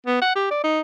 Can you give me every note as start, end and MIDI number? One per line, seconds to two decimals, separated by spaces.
0.06 0.20 59
0.22 0.34 78
0.35 0.47 67
0.51 0.61 74
0.64 0.81 63